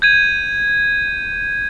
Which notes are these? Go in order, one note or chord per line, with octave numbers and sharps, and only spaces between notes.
G6 G#6 D#7